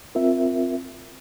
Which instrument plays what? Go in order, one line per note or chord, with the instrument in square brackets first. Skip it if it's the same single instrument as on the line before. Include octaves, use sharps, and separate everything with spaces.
[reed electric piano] C4 F4 A#4 E5